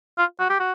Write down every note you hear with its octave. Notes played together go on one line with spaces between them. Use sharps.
F4
F#4
G4
F#4